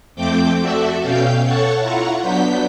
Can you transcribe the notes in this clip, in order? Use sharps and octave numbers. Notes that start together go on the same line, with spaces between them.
F2 A3 C4 G5 D6 G6
F#4 A4 D5 E5
B2 C#4 F5 G5 G6
A4 C#5 F#5 A5 C#6
E4 F4 F#5 A#5 C#6
F#3 B3 D4 G6 B6